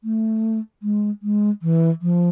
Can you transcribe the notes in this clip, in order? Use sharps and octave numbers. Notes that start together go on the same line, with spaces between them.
A3
G#3
G#3
E3
F3